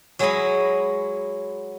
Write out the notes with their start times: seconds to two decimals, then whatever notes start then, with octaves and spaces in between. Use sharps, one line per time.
0.19 F#3 G#3 E4 C#5 D#5 B5